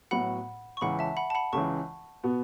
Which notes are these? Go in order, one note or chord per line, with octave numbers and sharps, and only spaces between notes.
A2 F#3 B3 F#4 F#5 B5
C#6
C#2 C#3 E3 F#5 B5
E5 A5
F#5 B5
A5
F#5 B5
C#2 C#3 E3 A5 C#6
B2 B3 F#4